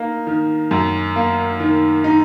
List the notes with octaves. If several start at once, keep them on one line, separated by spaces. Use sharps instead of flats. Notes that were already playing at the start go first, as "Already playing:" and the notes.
Already playing: A#3 D#4
D#3
F#2
A#3
D#3
D#4